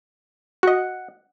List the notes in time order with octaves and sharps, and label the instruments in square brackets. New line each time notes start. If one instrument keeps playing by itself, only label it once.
[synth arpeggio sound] F#4 D#5 [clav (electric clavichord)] F#5